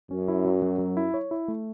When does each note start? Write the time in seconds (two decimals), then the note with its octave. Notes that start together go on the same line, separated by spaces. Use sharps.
0.11 F#2 C#4
0.28 E4
0.45 F#3
0.62 F#3
0.79 F#3
0.97 E4
1.14 C#5
1.31 E4
1.48 A3